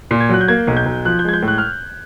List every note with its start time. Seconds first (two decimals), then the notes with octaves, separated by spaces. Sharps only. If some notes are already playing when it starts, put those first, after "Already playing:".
0.11 A#2
0.20 G#6
0.29 F#3 F#6
0.41 G6
0.48 A#3 G#6
0.67 B1
0.77 G6
0.86 B1
1.05 F3 F#6
1.19 G6
1.24 G#3 G#6
1.33 G6
1.42 A2
1.48 F#6
1.58 F6